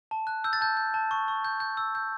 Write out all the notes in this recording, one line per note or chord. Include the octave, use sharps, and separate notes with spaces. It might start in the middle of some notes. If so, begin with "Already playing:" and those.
A5
F#6
E6 G6
A6
A5 G6
G6
A5
C#6
C#6
G6
G6
E6
G6